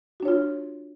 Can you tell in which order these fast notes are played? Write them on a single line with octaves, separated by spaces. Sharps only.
F#4 D4 C#5 F4